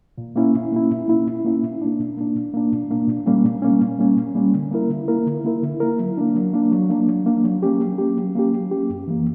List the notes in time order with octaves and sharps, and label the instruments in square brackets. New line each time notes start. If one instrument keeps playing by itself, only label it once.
[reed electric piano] A#2
A#3 C#4 E4
A#2
A#3 C#4 E4
A#2
A#3 C#4 E4
A#2
A#3 C#4 E4
A#2
A#3 D4
A#2
A#3 D4
A#2
A#3 D4
A#2
A#3 D4
A#2
G3 A#3 C#4
A#2
G3 A#3 C#4
A#2
G3 A#3 C#4
A#2
G3 A#3 C#4
D3
A#3 E4 A#4
D3
A#3 E4 A#4
D3
A#3 E4 A#4
D3
A#3 E4 A#4
F#3
A#3 D4
F#3
A#3 D4
F#3
A#3 D4
F#3
A#3 D4
F#3
A#3 C#4 G4
F#3
A#3 C#4 G4
F#3
A#3 C#4 G4
F#3
A#3 C#4 G4
F#2
E3 A#3